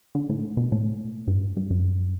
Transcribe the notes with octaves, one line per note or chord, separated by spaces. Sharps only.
D3
A2
B2
A2
G2
G2
F#2